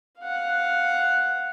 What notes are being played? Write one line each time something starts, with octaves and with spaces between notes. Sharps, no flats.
F5 F#5